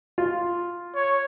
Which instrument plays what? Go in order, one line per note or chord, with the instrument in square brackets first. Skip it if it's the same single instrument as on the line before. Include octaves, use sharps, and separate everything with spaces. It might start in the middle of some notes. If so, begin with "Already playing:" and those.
[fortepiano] F4
[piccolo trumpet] C#5